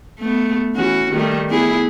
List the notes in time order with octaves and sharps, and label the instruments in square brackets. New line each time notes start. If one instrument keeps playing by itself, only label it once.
[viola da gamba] A3 B3
E3 C#4 F#4
D#3 G3 A3
B3 E4 G#4